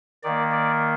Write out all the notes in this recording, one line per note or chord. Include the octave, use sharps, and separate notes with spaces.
D#3 A#3 D5
D5